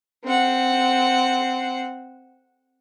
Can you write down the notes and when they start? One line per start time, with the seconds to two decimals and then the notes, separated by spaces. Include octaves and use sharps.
0.24 C4 F#5